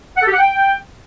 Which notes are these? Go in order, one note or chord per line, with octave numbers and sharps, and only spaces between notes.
F#5
A4
G4
F#5
G5